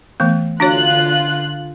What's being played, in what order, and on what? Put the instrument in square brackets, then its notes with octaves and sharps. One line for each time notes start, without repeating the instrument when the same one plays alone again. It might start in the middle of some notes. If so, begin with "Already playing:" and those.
[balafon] E3 A3 B3
[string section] D3 F4 F#6 [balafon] D4 F#4 C#5